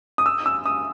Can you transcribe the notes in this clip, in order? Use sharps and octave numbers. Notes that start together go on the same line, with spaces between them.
D#6
E6
E6
D#6